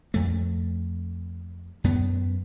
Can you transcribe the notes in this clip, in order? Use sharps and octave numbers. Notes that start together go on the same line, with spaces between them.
F2 A3
F#2 B3